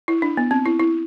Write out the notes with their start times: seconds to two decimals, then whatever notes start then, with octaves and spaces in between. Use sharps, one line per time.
0.08 E4
0.22 D4
0.37 B3
0.51 C4
0.66 E4
0.80 E4